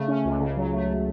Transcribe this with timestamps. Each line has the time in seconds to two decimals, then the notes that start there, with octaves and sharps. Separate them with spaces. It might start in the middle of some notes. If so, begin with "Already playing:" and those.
Already playing: C#3 A3
0.08 C#4
0.25 C#2
0.40 C#3
0.57 F#3
0.73 A3